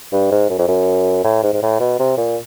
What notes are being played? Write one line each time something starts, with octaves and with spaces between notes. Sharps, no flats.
G2
G#2
F#2
F2
F#2
A2
G#2
G#2
A2
B2
C3
A#2